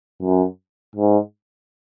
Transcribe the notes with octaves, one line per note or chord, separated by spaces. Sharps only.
F#2
G#2